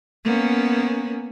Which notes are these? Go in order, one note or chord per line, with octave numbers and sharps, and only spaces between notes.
A#3 B3 C#4